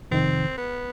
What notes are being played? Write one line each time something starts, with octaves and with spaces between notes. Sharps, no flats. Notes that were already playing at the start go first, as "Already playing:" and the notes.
F2 C3 D#3 C4
B3